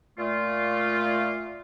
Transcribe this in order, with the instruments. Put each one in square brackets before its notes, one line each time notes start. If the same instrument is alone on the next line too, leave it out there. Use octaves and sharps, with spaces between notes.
[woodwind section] A#2 A3 F4